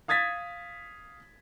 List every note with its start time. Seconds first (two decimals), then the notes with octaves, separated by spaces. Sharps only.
0.08 F5 D#6 G#6 A6 B6